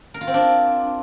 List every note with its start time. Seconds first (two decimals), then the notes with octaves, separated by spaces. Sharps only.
0.14 A#4
0.21 F4
0.27 C4
0.34 D4